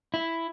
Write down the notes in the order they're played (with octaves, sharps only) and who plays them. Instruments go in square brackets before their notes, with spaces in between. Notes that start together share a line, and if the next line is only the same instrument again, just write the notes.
[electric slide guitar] E4